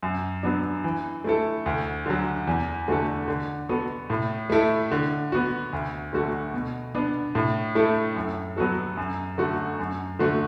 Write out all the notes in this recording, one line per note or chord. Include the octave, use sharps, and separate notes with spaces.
F#2
F#3 B3 D4
E3
A3 E4 A4
D2
D3 F#3
E2
D3 A3 F#4 A4
D3
B3 F#4 A4
A2
A3 E4 A4
D3
B3 F#4
D2
D3 A3 F#4 A4
B2
B3 D4
A2
A3 E4 A4
F#2
F#3 B3 F#4 A4
F#2
D3 A3 F#4 A4
F#2
D3 A3 F#4